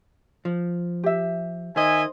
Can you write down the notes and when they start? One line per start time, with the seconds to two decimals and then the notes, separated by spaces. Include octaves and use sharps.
0.45 F3
1.04 G4 E5
1.76 D#3 C5 D#5 E5 G#5